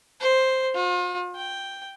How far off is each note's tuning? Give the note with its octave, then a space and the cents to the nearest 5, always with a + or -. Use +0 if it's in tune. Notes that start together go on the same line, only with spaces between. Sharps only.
C5 +0
F4 +40
G5 +0